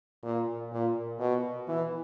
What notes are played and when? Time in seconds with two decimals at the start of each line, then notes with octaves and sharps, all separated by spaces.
0.24 A#2
0.72 A#2
1.20 B2
1.68 E3